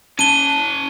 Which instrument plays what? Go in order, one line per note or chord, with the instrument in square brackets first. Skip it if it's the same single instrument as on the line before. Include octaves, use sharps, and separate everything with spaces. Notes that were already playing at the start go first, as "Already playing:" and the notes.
[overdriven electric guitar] C#4 A5 [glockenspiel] D#7 G7